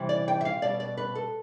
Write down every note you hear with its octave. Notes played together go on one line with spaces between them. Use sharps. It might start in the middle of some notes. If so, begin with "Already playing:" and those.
Already playing: C3 E3 G3
D5
G5
E5
F5
B2 G3 D5
D5
B4
A4